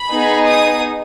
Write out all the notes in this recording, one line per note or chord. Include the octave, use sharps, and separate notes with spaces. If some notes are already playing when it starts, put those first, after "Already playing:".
Already playing: B5
B3 D#4 G#4
D#6